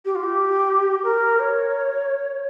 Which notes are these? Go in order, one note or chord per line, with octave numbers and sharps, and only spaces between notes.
G4
F4
G4
A#4
C#5